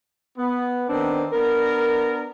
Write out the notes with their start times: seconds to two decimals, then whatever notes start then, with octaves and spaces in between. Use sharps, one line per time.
0.38 B3
0.89 D#3 B3 C4 D4
1.32 B3 D4 A#4